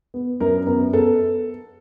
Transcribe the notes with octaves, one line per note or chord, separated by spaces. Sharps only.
B3
F#2 A#4
B3 A#4
B3 A4